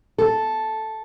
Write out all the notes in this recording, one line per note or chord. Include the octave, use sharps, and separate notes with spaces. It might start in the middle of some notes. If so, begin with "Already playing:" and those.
A4